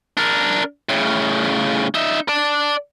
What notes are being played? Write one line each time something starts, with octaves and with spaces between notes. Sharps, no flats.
D4 A#4
A2 C#3
D#4 E5
D5 A5